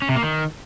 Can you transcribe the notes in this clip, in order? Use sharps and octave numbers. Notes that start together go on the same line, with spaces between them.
C#4
C3
A#3
D#3